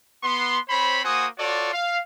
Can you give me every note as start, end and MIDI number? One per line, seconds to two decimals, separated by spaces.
0.24 0.58 59
0.24 0.58 84
0.69 1.02 60
0.69 1.02 72
0.69 1.02 73
0.69 1.02 83
1.04 1.26 58
1.04 1.26 66
1.04 1.26 72
1.04 1.26 78
1.04 1.26 80
1.04 1.26 87
1.38 1.72 65
1.38 1.72 66
1.38 1.72 69
1.38 1.72 73
1.38 1.72 74
1.73 1.99 77